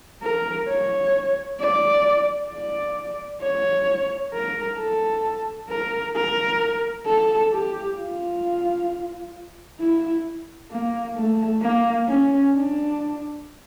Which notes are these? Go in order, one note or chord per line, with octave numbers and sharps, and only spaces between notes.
A#4
C#5
D5
D5
C#5
A#4
A4
A#4
A#4
A4
G4
F4
E4
A#3
A3
A#3
C#4
D4